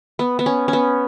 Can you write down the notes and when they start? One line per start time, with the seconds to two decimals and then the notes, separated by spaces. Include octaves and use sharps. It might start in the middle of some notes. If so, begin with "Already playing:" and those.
0.19 B3
0.39 B3
0.46 C#4
0.68 C#4
0.73 B3